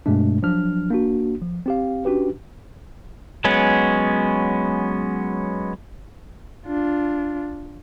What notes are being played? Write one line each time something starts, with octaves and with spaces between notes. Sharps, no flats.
G2 B2 G#3 A3 D4
F3 F#3 D4 F6
A#3 D4 F#4
F3
C4 G4 F5
C#4 D4 F#4 G4 B4
F#3 G#3 B3 C#4
D4 F4